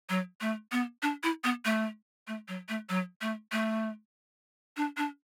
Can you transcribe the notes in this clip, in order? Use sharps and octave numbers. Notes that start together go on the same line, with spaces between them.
F#3
A3
B3
D4
E4
B3
A3
A3
F#3
A3
F#3
A3
A3
D4
D4